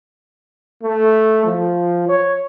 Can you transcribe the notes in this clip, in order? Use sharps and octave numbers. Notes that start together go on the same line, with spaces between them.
A3
F3
C#5